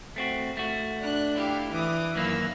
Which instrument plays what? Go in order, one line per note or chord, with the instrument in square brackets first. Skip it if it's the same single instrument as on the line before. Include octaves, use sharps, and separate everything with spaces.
[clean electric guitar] A3 C4 F#4
A3 F#4
[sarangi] D4 [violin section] F#6
[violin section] E4 G4 F5
[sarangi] E3 [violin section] D6 D#6
[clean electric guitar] F#2 D#3 A#3 [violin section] E4 F5 E6